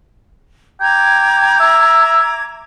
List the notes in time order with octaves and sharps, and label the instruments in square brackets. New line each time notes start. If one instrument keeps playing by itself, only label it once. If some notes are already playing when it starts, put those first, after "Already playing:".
[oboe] G5 [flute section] A#5 D6 G#6
[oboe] E5